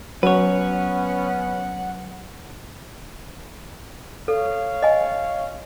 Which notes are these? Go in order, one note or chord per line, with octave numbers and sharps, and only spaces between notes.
F#3 B3 C#4 B4 C#5 F#5
A4 C#5 F5
D#5 G#5